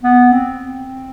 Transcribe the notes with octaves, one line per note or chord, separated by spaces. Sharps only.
B3
C4